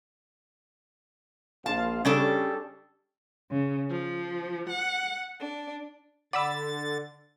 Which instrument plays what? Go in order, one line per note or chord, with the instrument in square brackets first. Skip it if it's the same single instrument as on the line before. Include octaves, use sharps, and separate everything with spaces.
[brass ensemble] A#1 F4 F5 [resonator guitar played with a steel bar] A5
[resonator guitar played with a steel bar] C#3 D4 A4 [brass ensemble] G3 C#4
[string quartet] C#3
F3
F#5
D4
[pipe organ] D3 A6 [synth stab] D5 B5 E6 [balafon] F#5